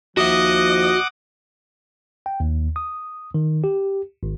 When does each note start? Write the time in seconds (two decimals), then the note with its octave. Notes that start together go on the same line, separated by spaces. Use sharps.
0.17 D#2 F3 F#4 D#5 E5 F#5 D6 D#6
2.26 G5
2.40 D#2
2.76 D#6
3.34 D#3
3.64 G4
4.23 G#1